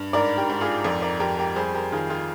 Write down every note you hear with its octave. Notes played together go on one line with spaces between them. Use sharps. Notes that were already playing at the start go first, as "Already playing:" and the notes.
Already playing: G2
G#2 A#4 D5
G4 A#4
G#2
F4 G#4
F2 A#4 D5
A#4 D5
F2 G4 A#4
G4 A#4
G3 G#4 C5
G4 A#4
D#3 F4 G#4
F4 G#4